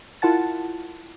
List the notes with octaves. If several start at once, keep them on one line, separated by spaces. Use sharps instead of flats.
E4 F4 A#4 F#5 A5 A6